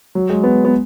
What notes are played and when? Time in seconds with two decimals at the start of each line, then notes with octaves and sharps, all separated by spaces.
0.15 F#3
0.30 G#3
0.44 B3
0.65 B3